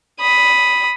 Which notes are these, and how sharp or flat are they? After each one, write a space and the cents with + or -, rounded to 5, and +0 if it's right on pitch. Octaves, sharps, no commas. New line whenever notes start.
B5 +0 D#6 +5